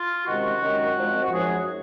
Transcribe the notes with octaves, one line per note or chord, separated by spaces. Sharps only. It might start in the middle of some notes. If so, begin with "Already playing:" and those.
Already playing: F4
C3 D#3 G#3 C#4 F#4
F#2 D#3 G#3 D#4
A#2 F3 G#3 C4
F#4
F#2 F3 G#3 D#4 G#4